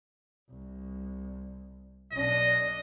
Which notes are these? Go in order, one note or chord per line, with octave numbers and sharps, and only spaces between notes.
C2
B1 D4 D#5